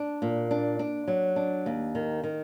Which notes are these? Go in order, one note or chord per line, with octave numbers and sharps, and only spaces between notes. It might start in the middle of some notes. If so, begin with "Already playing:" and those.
Already playing: D4
A#2
D4
D4
F#3
D4
D#2
D#3
D#3